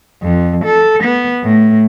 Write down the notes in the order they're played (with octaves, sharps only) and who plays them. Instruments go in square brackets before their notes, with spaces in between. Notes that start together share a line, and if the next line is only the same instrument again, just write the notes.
[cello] F2
A4
B3
A2